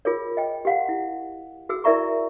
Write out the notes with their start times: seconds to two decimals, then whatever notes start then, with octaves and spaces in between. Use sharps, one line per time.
0.05 F4 G#4 A#4 C#5
0.37 D#5 G5
0.65 G4 F5 F#5
0.89 E4
1.69 F#4 G#4 E6
1.84 E4 A#4 D5 E5 A#5 C#6